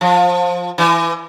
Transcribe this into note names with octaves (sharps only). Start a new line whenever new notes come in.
F3
E3